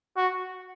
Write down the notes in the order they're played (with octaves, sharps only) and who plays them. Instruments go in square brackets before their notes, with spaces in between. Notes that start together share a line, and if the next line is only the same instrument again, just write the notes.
[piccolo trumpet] F#4